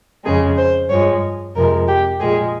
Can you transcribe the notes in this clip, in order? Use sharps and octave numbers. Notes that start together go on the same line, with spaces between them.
F2 C#3 G#3 G#4
C5
G2 F3 G#3 C#5
F2 C3 F3 G#3 A#4
G4
A#2 F3 G#3 G#4